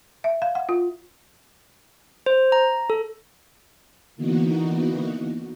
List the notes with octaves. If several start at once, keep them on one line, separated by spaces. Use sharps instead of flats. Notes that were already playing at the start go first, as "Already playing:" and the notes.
E5
F5
F#5
F4
C5
A#5
A4
D3 E3 A#3 B3 D#4 F#4